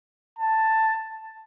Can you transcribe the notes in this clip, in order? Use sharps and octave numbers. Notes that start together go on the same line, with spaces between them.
A5